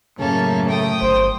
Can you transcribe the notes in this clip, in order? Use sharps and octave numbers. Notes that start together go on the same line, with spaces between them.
F#2 A2 C#3 A#3 C#4 A4
A3 G5 D#6
G1 C5